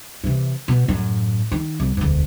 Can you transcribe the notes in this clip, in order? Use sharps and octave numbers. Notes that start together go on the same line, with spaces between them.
C3 E3
B2
F#2 A2
D#3
C2
E1 D2